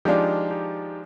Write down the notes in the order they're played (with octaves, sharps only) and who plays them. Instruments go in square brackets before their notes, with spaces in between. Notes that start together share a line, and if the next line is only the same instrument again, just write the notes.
[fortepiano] F3 G#3 D4 F4 [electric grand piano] D#4 G4
[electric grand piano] D#4 G4